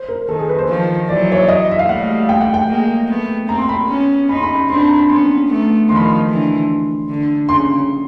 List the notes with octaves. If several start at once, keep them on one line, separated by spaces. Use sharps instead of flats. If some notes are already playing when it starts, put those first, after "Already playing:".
Already playing: C5
A#4
D#3 A4
G#4
B4
C5
D#3 F3
E3 F#3 D5
C#5
D5
D#5
E5
F5
G3 A3 F#5
G5
F#5
G5
G#3 A#3
A3 B3
A#3 C4 A#5
C6
B5
B3 C#4
C#4 D#4 B5
C6
B5
B5
C4 D4 C6
B5
A#5
B5
B3 C#4 C6
A3 B3
D#3 F3 C6
B5
C6
D3 E3
D3
C#3 C6